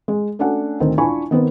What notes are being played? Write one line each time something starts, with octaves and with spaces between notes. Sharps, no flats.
G#3
A3 C#4 D4 F#4 A4 F#5
D2 D#3 A3 C4
D4 E4 F4 G#5 B5 C#6
D#3 B3 C4 A#4 B4